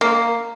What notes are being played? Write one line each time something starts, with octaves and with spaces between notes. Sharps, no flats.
A#3